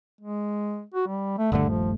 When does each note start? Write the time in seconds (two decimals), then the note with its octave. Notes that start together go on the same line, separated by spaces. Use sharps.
0.21 G#3
0.94 F#4
1.07 G3
1.38 A3
1.52 D#1 G2 D3 A3
1.70 F3